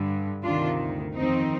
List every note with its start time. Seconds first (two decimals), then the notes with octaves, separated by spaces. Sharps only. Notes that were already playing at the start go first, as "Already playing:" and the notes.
Already playing: G2 D3
0.43 D2 C3 D#3 D4 F4
1.15 F2 D#3 C4 D#4